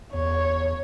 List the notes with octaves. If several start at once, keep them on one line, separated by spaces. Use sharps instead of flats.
E2 C#5